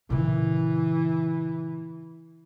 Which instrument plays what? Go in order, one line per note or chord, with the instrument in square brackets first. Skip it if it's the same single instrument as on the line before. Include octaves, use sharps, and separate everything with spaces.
[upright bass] A#2 C#3 [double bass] E3